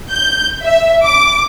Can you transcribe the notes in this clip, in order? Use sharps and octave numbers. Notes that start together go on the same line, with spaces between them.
G6
E5
D6